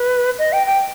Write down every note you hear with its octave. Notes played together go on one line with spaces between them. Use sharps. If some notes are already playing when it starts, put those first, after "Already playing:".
Already playing: B4
D#5
G5
G5